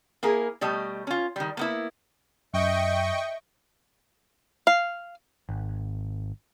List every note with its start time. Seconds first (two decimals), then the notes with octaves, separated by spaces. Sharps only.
0.23 A#3 E4 G#4 A#4
0.61 B2 G3 A3 D#5
1.07 C#4 F4
1.36 D#3 G3
1.57 A#3 B3 E4
2.54 F#2 D#5 E5 G5 C#6
4.67 F5
5.49 G#1